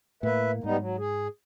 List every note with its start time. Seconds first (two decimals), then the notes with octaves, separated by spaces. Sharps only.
0.23 A2 A#3 B4 E5
0.64 G#2 G3 B3 D#4
0.78 F#3
0.98 G#4